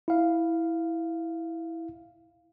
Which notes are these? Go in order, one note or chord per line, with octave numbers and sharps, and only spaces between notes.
E4 F5